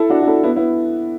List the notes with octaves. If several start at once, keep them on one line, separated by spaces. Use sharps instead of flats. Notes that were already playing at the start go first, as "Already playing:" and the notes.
Already playing: E4 A4
D4 F#4
F#4
E4 A4
B3 E4
B3 E4